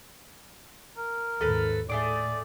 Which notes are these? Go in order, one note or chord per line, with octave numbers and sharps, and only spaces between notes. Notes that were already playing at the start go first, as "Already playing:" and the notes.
A#4
D#2 G#2 A4 B4 A#5
A2 A3 G#4 D5 D6